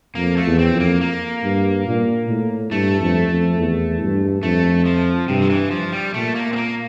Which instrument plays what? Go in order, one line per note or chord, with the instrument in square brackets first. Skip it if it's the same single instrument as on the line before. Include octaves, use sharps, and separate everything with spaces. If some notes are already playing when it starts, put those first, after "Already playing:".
[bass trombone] F2 [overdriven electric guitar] A#3
[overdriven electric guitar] A3
[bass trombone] E2
[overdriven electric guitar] C4
[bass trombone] F2
[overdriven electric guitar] A#3
A#3
[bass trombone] G2
A#2
A2
[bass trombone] G2 [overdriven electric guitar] A3
[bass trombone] F2
F2
E2
G2
[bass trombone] F2 [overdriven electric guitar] A3
[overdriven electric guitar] F3
[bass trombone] G2 [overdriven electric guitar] C3
[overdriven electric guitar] F3
E3
F3
G3
[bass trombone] A#2 [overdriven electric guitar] A3
[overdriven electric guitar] A#3
C4
A#3